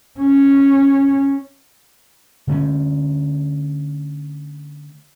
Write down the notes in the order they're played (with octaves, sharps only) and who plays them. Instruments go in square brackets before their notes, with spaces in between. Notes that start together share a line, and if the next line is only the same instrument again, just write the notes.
[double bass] C#4
[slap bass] D3 A3 C#4